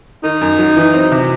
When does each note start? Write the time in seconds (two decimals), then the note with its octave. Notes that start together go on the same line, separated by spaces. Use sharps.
0.23 D#3 D#4
0.41 F#2
0.59 F#3
0.77 E3
0.94 C4
1.12 C3